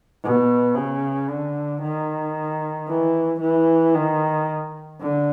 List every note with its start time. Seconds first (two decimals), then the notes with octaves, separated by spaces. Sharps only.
0.24 B2
0.76 C#3
1.29 D3
1.82 D#3
2.88 E3
3.41 E3
3.95 D#3
5.01 D3